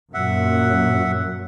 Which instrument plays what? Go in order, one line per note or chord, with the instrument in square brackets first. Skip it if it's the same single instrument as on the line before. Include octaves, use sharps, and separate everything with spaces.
[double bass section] F#2 A#2 [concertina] E5 F#5